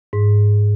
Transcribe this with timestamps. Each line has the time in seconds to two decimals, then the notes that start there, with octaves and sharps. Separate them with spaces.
0.13 G#2